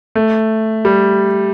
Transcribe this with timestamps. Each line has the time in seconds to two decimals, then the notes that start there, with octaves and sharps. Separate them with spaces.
0.15 A3
0.85 G3